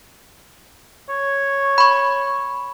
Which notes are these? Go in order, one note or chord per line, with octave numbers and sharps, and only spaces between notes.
C#5
B5 C#6